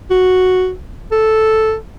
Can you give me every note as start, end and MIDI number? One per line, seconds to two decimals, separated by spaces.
0.11 0.71 66
1.12 1.75 69